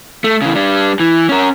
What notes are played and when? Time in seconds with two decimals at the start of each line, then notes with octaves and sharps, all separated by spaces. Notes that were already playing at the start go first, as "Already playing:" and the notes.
0.24 A3
0.42 C#3 E3
0.55 G3 D4
1.00 E3
1.29 C#4 A#4